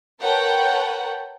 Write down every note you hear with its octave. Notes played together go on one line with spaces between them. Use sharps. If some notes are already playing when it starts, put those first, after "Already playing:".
A#4 B4 C#5 F#5 G5 A5